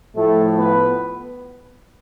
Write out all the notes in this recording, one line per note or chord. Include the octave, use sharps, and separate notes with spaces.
A2 F3 A3 A4
B3 B4